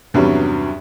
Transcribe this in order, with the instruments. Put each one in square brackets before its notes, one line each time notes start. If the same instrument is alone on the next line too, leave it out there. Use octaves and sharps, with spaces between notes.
[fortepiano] E2 G2 C3 F#3 G3 C#4